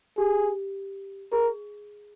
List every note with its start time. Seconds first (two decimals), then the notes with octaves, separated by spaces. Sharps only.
0.17 G4 G#4
1.32 G#4 A#4